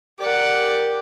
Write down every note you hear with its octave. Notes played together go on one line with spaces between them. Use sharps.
G4 A#4 D5 F#5